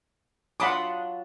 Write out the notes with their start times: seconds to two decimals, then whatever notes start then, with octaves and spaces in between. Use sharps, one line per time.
0.60 F#3 D4 F4 F#5 B5 C6 D6 D#6